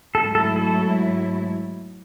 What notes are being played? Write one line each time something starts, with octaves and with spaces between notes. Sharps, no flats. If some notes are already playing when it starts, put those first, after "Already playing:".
G#2 F#3 A3 E4 A4
A4
A4